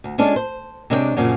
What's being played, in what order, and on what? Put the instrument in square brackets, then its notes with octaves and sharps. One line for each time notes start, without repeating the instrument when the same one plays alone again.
[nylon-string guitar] D2
G#3 C#4 D4 F4 A4 D5
C5
C3 G#3 D4 C#5 D5 G5
F#2 A#2 C#3 F3